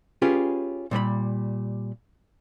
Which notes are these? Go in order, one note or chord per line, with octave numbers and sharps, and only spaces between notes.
C#4 F4 G4 G#4 B4
A#2 G3 C5 B5